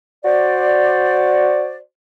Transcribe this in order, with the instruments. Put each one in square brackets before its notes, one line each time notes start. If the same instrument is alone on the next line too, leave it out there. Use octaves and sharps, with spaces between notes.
[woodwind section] F#4 C5 D5